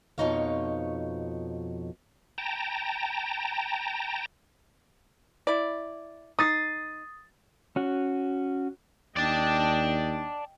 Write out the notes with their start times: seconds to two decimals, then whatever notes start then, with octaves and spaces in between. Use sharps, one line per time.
0.18 F2 B2 F3 D#4 C#5 F5
2.38 G5 A5 A#5
5.47 E4 D5
6.39 D#4 D#6 A6 C7
7.76 C#4 F#4
9.16 D#2 D5 D#5 G5 A5